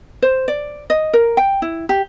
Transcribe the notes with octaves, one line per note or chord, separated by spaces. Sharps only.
C5
D5
D#5
A#4
G5
E4
G4